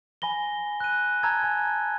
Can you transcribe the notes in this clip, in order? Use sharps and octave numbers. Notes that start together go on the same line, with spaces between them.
G#5 B5 A#6 G7
F#6 D#7
A5 A#5 E6 G#6
G#5 A#5